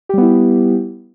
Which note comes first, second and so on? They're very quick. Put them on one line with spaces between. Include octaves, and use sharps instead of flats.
G4 G3 B3 E4